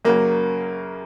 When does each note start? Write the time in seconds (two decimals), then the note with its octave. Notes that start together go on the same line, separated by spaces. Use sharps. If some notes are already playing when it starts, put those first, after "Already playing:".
0.05 F#2 C#3 F#3 A#3